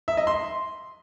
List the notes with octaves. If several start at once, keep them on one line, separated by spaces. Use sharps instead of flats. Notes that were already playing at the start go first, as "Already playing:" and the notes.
E5
D#5
C6